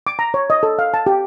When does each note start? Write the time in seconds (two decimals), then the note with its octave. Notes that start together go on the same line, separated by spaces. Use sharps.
0.07 D6
0.19 A#5
0.34 C#5
0.50 D#5
0.63 A4
0.79 F5
0.94 A5
1.07 G4